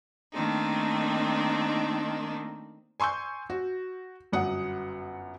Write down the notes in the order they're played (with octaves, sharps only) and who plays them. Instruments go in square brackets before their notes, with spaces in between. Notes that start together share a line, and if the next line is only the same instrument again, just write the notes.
[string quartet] D#3 A3 A#3 C4 D4 D#4
[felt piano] G#5 C6 C#6 E6 G6
F#4
G1 F#2 F#5 D#6